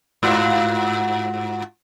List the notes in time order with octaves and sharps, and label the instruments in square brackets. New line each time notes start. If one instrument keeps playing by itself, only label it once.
[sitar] G#2 F4 F#4